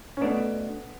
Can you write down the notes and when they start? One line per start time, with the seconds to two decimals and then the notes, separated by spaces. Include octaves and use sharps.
0.17 C#4
0.21 B2 A3 B3 D4